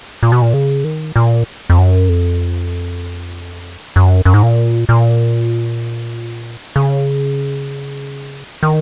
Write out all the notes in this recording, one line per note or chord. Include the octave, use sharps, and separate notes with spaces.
A#2
B2
A#2
C#3
D#3
A#2
F2
F#2
F2
F#2
F#2
G#2
A#2
A#2
C#3
D#3